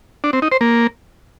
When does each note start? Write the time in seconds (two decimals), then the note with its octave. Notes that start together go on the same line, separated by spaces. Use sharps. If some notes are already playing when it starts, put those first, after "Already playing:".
0.24 D4
0.33 C4
0.42 D#4
0.52 C5
0.61 A#3